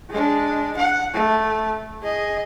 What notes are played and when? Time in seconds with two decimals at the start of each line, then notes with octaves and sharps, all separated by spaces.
0.10 G#3 D4
0.77 F#5
1.13 A3
2.03 G#4 D#5